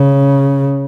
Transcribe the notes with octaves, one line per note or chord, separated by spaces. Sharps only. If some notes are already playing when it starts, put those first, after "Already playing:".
Already playing: C#3